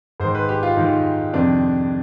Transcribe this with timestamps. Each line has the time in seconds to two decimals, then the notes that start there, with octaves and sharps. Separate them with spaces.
0.20 G#2 D#3 C5
0.35 B4
0.49 G4
0.63 F4
0.77 G#2 D#3 D#4
1.33 F2 C3 D#3 D4